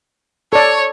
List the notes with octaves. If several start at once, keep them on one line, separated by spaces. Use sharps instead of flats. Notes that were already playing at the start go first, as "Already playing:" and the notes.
A4 C#5 D5